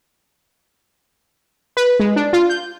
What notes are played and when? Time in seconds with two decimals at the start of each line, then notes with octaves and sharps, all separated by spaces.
1.77 B4
2.00 G#3
2.16 D4
2.33 F4
2.50 G6